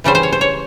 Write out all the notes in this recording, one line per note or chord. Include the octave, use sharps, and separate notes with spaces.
C#3 E3 G3 C5
C5
C#5
C5
C#5